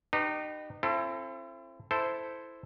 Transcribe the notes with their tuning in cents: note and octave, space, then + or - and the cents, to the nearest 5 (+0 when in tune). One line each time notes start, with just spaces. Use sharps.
D#4 -30 G4 -20 B4 +0
C4 +25 E4 +40 A4 +0
E4 +0 A4 +0 C5 -10